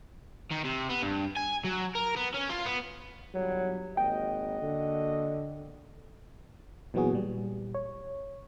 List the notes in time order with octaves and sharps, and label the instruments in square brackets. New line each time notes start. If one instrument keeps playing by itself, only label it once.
[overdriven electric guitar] D#3
C3
B3
G2
G#5
F#3
A#4
B3
C#4
F4
B3
[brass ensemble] G1 E3 G3 [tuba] F#3
[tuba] G#1 [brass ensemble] A#3 F#4 D#5 [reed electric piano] G5
[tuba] D3
[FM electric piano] A#2 E3 F#3 B3 F#4 G#4
A#2 G3
C#5